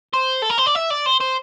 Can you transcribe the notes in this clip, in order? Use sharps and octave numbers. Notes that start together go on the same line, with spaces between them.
C5
A4
A#4
C5
D5
E5
D5
C5
C5